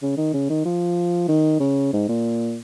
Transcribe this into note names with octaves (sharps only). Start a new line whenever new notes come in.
C#3
D#3
C#3
D#3
F3
D#3
C#3
G#2
A#2